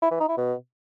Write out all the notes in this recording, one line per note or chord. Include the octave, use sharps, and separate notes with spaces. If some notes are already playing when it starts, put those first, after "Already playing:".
E4
E3
D#4
E4
B2